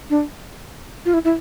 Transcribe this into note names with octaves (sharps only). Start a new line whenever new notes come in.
D4
F4
E4
E4